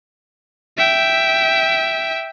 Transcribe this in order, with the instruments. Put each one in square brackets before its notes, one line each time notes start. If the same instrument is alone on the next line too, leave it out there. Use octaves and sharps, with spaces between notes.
[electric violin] E5 G5